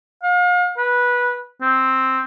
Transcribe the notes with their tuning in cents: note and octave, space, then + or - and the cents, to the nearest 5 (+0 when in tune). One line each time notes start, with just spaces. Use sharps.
F5 +40
B4 -15
C4 +5